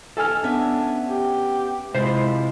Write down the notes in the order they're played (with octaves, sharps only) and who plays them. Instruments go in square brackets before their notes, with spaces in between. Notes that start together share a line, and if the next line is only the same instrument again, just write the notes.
[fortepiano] A4 G#5 F6
[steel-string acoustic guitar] B3 C#4 E5 [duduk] D4
[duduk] G4
[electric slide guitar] C3 E4 F4 [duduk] G#3 [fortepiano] C5